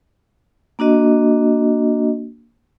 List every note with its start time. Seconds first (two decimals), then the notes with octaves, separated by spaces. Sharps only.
0.79 A#3 D4 F#4 D#5